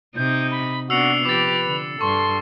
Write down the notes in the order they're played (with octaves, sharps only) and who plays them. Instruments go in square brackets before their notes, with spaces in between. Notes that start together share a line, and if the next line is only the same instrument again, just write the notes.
[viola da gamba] C3 D#4 D#5 [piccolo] G6
[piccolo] B5
[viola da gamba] C3 B3 D4 [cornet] F#4 [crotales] E6 C7 C#7 [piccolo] F7
[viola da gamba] F3 G4 [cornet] B4 [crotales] D6 A6
[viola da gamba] D3
[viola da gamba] G2 [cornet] A4 [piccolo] C6 [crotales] C#6